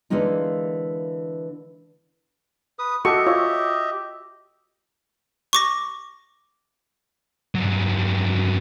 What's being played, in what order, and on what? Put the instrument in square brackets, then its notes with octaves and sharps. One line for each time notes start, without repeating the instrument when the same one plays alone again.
[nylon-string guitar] D3 E3 G#3 A#3 D#4 F4
[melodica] B4 D#6
[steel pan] F#4 A4 C#6 [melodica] G4 D#5 E5
[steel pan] F4 C#5
[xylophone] C#6 D6 A#6
[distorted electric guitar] G2 F#3